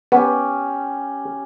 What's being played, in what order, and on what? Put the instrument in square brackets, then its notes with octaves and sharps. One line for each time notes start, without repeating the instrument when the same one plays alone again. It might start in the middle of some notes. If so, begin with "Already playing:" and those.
[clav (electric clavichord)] B3 [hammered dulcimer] C#4 G4